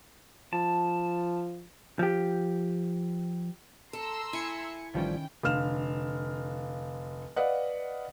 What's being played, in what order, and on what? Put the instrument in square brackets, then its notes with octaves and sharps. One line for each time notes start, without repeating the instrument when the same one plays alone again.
[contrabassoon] F3 [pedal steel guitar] A5
[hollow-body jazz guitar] F3 G4
[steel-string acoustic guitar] A4 [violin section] A#5 C6 E6
[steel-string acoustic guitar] E4 [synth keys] G#5 C#7
[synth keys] A1 F3 G3 [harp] D#3 C#4 [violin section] G5
[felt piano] F1 D3 F5 F6 E7
B4 D5 D#5 F5 F#5